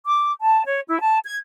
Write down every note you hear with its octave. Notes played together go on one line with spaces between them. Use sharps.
D6
A5
C#5
E4
A5
G#6